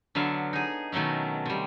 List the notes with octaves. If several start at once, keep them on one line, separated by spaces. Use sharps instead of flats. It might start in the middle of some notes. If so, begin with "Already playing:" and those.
D3 F#3 B3 E5 F5
D#4 G#4
B2 D#3 F#3 A3 C#4
C3 G3